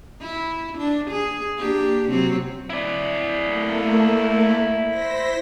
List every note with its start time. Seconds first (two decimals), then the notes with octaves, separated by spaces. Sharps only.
0.21 E4
0.78 D4
1.10 G#4
1.58 A#3 D4 G4
2.08 C3 F#3 C4
2.70 E4 D5
3.44 A3 A#3
4.87 C5 A#6 B6